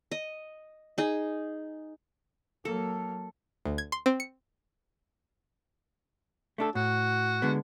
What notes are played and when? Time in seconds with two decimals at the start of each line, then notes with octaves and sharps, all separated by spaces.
0.11 D#5
0.98 D#4 G#4
2.65 F#3 A#3 A4
3.65 D2
3.78 G#6
3.92 C6
4.06 C4
4.20 C#7
6.58 A3 D4 A4
6.75 A2 F#4
7.42 D3 G#3 B3